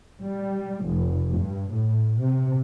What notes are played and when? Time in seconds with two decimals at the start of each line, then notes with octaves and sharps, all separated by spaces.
0.22 G3
0.86 F1
1.37 G2
1.72 A2
2.20 C3